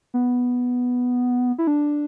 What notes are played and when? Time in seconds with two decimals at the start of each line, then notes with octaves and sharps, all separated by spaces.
0.14 B3
1.58 E4
1.67 D4